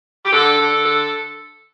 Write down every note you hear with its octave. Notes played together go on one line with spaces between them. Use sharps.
G4
D3 A4
D3
A4